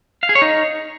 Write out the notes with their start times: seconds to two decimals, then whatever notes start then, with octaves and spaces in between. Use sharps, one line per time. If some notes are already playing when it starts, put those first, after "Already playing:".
0.23 F5
0.29 G#4
0.35 C#5
0.42 D#4